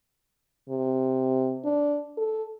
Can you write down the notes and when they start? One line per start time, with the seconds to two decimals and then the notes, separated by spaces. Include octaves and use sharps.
0.69 C3
1.64 D4
2.18 A4